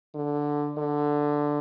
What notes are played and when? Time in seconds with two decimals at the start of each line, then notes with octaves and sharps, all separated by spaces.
0.15 D3
0.78 D3